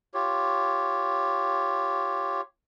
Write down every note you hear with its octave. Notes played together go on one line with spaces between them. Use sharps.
F4 G4 C#5